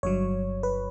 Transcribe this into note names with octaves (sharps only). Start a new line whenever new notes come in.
G1 G2 F#3 C#5
B4